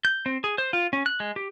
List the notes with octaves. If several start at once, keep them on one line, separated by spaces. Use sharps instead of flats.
G6
C4
G#4
C5
F4
C#4
F#6
G#3
G4